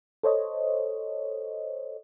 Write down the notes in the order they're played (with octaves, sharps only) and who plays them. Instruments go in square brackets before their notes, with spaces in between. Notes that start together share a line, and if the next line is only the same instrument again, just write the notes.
[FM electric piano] A4 C5 C#5 D#5